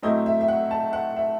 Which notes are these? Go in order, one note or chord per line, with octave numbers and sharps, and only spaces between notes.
A2 F#3 A3 C4 E4 D#5
E5
E5
F#5
A5
F#5
E5